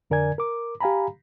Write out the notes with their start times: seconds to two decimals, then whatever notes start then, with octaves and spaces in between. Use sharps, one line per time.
0.10 F2 D3 A#4 D5 G#5 G#6
0.38 A#4 D6
0.81 G4 F5 G#5 A#5 B5